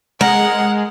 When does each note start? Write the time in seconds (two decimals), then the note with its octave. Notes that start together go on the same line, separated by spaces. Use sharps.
0.21 G#3 A#4 F#5